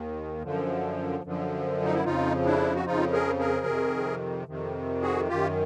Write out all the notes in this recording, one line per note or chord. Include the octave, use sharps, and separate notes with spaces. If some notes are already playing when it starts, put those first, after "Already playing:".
Already playing: D#2 D#3
F#2 D3 F3
F#2 D3 F3
D#4
E4
F2 C#3 F3 D#4 F4
D4 E4
F#4
F2 C#3 F3 D#4 F4
G#4 A#4
G#4 A#4
F2 C3 D#3
F2 C3 D#3
F#4 G#4
F#2 D#3 F4 G4